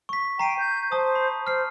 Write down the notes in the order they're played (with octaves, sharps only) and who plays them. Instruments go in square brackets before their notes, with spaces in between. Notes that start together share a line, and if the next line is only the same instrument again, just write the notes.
[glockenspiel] C#6 B6
[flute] G5 [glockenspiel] A#5 C7 D#7
[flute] G6
[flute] C5 [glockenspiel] A5 D#6
[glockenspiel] B5
[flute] C5 [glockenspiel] F6 C7